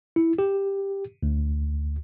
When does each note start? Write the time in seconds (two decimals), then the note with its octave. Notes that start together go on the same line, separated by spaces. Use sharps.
0.16 E4
0.38 G4
1.23 D2